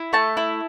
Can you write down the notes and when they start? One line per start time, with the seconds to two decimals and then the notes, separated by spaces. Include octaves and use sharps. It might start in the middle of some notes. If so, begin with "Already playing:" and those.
Already playing: E4
0.13 A3 A5
0.37 E4